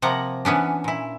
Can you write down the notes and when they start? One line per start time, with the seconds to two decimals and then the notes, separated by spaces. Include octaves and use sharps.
0.02 C3 F3 A#3 F#5 A#5
0.45 E3 B3 C#4 D4
0.84 A#2 E4